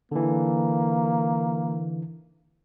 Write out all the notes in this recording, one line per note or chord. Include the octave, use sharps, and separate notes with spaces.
D3 E3 A#3